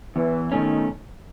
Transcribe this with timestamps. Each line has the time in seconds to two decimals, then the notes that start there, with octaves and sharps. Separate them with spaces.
0.16 E2 E3
0.52 B2 D#3 A3 C#4